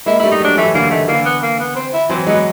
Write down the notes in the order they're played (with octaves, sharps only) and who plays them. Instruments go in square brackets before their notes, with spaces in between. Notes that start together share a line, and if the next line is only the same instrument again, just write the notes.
[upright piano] G#3 A#3 [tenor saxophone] E4
[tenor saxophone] E4
[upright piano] G3 A3
[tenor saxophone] D#4
[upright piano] F#3 G#3 [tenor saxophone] D4
[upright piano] E3 F#3 [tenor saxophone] A3
[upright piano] D3 E3 [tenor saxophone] A#3
[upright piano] D#3 [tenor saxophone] A3
[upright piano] D3 E3 [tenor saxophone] A#3
[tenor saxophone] B3
A#3
B3
C4
E4
[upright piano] E3 F#3 [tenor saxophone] C4
[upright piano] F#3 G#3 [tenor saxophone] B3